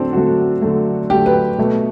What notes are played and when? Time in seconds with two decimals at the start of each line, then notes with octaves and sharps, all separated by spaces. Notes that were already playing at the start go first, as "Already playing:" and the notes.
Already playing: D3 F#3 A3 C4 D4 A4
0.13 D3 F#3 A3 F#4
0.62 D3 F#3 A3
1.10 D3 F#3 A3 G4
1.26 B4
1.58 B2 A3